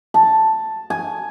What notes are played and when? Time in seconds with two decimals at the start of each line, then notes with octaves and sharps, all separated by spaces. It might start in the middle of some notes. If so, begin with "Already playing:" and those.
0.14 A5
0.90 G#5